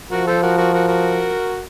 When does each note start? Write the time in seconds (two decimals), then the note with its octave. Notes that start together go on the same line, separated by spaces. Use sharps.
0.11 F3 F#4 A#4
0.27 A4 C5
0.43 F#4 A#4
0.58 F#4 A#4
0.73 F#4 A#4
0.87 F#4 A#4